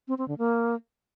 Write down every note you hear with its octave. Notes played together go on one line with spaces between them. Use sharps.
C4
C4
D3
A#3